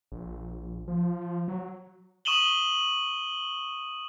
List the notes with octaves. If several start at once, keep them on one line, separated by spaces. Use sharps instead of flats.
A#1
F3
F#3
C#6 D#6 D#7 E7 F#7 G7